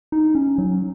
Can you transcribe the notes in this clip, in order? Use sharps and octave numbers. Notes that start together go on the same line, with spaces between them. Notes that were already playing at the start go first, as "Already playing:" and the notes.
D#4
C#4
F#3